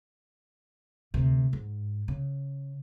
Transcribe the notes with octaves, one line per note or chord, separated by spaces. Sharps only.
D2 C3
G#2
C#3